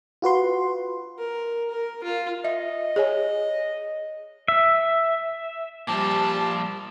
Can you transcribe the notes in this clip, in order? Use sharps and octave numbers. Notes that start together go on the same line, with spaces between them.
F4 F#4 B4 C6
A#4
A#4
F4
D#5 E5
G#4 C#5 G#5
E5
A#2 F3 G3 A5 D6